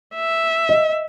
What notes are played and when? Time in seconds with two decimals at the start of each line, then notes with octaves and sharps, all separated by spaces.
0.15 E5
0.69 D#5